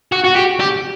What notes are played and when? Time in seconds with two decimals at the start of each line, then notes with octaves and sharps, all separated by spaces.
0.12 F#4
0.24 F#4
0.36 G4
0.60 G4